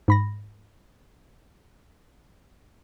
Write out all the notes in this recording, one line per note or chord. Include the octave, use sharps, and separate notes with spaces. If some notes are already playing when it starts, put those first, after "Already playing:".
G#2 B5 A#6